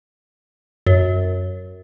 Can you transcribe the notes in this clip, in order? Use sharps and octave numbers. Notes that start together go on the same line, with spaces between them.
F#2